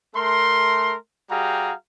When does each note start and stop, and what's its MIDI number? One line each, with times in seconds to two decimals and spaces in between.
0.15 0.96 57
0.15 0.96 70
0.15 0.96 84
1.31 1.73 55
1.31 1.73 66
1.31 1.73 68
1.31 1.73 77
1.31 1.73 79
1.31 1.73 82